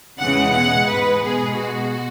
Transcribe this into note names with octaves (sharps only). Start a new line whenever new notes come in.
E2 C#3 E3 G#3 F#5
B2 G#3 F#5
G#2 G#3 B4
B2 G#3 G#4
B2 G#3 F#4